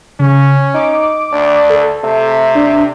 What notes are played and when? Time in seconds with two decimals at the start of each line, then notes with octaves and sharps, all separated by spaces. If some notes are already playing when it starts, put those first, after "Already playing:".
0.19 C#3 C#4
0.74 D#4 D6
1.32 D2 D4
1.70 A4
2.04 C3 A3
2.55 D4